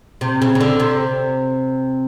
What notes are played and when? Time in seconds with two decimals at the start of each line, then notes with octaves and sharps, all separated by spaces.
0.21 C3
0.42 C#3
0.55 C#3
0.61 D3
0.80 C3